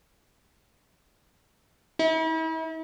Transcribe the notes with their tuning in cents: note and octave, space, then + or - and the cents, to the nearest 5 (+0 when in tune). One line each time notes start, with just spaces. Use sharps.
E4 -40